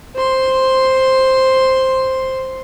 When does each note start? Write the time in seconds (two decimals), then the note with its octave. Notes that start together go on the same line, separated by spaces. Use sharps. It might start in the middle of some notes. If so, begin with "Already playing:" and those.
0.15 C5 C6